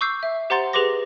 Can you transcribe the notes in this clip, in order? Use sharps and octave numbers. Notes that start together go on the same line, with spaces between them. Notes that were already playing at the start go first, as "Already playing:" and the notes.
C#6 D6 E6 G6 C7
E5
G4 C5 F#5 A#5 C6 A6
G4 G#4 B4 C6 D6 A#6